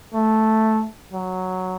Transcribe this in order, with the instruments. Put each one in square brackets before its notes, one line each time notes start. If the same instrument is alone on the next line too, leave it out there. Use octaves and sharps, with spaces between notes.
[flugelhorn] A3
F#3